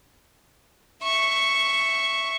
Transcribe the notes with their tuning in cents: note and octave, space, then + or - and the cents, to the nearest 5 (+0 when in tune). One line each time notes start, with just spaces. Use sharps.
E5 +0 C#6 +0